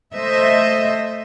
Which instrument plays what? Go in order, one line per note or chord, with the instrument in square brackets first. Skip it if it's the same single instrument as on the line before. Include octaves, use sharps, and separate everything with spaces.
[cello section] A3 C5 D#5 E5